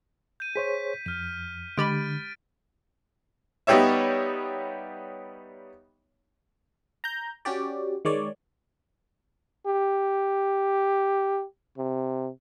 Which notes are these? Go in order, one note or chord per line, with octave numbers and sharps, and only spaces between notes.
G6 D#7
G#4 C5 C#5 B6
F2 F6 D#7
D3 G#3 G4 B5 F6 A6 D7
G3 B3 D#4 G4 C#5 E5
A#5 G6
C#4 F#4 G4 D5
D#3 G#3 C#5 D5
G4
C3